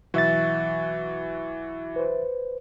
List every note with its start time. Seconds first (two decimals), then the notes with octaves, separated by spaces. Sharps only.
0.14 B1 E3 F#4 E5 A6
1.96 B4 C5